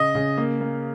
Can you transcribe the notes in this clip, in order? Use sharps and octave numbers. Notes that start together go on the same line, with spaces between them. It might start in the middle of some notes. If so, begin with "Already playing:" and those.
Already playing: C#3 D#5
C#3
A#3
A#3